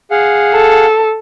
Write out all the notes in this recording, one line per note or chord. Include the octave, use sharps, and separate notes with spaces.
G#4 F5 F#5
A4